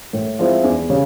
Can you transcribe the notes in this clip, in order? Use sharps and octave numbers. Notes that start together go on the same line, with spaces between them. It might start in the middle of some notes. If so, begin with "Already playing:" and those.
A2
F3 G#3 C4 E4
E2
C#3